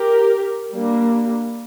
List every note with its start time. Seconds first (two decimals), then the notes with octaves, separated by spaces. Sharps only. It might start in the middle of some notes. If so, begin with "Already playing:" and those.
Already playing: G4 A#4
0.72 G3 A#3 D4